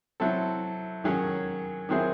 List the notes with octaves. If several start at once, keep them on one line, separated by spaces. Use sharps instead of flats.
F#3 C4 E4 A4
D#3 F#3 C#4 G#4
D#3 F#3 C4 E4 G#4